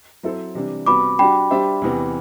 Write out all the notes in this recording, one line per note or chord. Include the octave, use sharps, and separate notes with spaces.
F#3 C4 E4 A4 C5
C3 E3 G3 D4
C3 G3 B3 F#4 B5 D6
G3 D4 F#4 G5 B5
G3 D4 G4 C5 E5
E2 C3 E3 B3